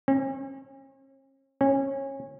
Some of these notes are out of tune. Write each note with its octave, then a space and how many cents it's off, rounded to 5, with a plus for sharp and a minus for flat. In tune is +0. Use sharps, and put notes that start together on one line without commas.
C#4 -45
C#4 -25